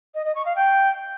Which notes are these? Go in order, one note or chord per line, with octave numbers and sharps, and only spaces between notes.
D#5
D#5
C#6
F5
G5